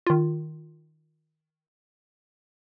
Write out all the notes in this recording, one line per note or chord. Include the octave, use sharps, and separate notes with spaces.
D#3 F4